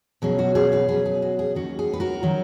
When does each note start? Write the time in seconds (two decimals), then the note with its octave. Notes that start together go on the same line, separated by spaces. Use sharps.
0.22 B2 F#3 C#4 G#4
0.39 F#4
0.55 G#4
0.72 G#4 B4
0.89 B2 F#3 C#4 G#4 B4
1.06 G#4
1.22 F#4
1.39 G#4
1.55 D#2 D#3 F#3 C#4 F#4
1.79 G#4
1.93 B4
2.00 F#4 A#4
2.23 D#3 F#3 C#4